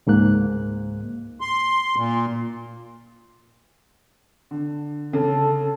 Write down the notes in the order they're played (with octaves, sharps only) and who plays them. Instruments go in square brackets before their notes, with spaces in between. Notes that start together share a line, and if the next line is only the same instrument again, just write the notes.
[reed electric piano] C#2 G#2 A#3 F#6
[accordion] C6
A#2
[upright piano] D3
[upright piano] C#3 [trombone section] A4